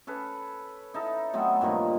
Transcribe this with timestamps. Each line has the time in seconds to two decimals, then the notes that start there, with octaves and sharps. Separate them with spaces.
0.07 C#4 A4 B4
0.94 D#4 E4 A4
1.33 F#3 A3 B3 C4
1.61 G2 A#2 D#3 F3